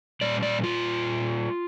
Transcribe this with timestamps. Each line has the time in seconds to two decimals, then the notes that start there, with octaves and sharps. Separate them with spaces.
0.21 A#2 G3 D5
0.43 D5
0.64 F4